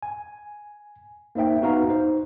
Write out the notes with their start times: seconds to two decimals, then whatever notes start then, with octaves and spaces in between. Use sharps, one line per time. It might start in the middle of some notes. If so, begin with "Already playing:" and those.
0.03 G#5
1.35 A#3 D#4 C5 E5 G5
1.62 B3 D#4 F#4 B4 F5 A#5
1.88 D#4 C5